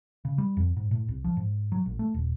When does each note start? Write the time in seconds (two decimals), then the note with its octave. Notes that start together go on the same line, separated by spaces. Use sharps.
0.25 C#3
0.38 G3
0.57 F2
0.77 G#2
0.91 A2
1.09 C2
1.24 F3
1.37 G#2
1.72 F#3
1.86 A1
1.99 A3
2.14 D#1